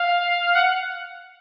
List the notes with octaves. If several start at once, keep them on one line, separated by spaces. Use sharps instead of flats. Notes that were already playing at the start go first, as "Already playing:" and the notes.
Already playing: F5
F#5